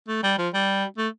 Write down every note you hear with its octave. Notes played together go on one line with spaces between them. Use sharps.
A3
G3
F3
G3
A3